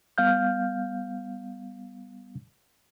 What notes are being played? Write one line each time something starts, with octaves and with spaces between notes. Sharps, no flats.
G3 B3 F5 F6 G6